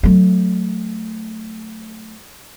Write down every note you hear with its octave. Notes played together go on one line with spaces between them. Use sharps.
F#3 A3